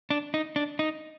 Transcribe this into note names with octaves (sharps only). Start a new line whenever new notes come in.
D4
D#4
D4
D#4